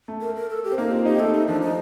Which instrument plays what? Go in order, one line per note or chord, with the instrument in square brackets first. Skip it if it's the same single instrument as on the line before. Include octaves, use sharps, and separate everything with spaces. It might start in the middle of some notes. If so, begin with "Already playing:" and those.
[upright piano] A3
[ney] A#4
A#4
A4
G4
[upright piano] C4
[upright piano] A#3 [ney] D#4
[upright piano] C4 [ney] F4
[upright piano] D#4 [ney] G4
[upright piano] A3 [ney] A4
[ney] D#4
[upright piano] F3 [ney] D4
[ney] D#4